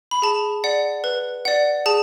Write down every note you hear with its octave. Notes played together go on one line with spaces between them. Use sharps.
B5
G#4 A5
D5 F#5
B4
D5 F#5
G#4 A5